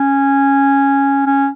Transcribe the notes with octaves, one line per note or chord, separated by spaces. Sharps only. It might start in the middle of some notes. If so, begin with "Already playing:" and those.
Already playing: C#4
C#4